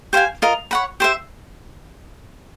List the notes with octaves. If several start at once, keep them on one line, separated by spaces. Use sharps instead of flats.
G4 C5 F5 G#5
F4 A#4 D#5
C#5 F#5 B5
G4 C5 E5